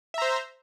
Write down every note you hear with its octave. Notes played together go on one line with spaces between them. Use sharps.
C5 E5 A#5